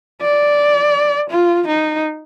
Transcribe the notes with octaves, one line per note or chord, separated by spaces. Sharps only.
D5
F4
D#4